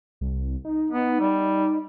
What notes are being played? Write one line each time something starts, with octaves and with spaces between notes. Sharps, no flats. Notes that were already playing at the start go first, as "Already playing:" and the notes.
C2
D#4
B3
G3